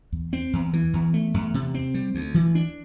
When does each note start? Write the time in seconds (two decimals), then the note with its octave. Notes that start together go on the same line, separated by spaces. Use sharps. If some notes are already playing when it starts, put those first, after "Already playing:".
0.12 E2
0.33 C4
0.53 E2
0.73 E3
0.93 E2
1.14 A3
1.34 E2
1.54 C3
1.74 C4
1.94 G3
2.15 D2
2.34 E3
2.55 D4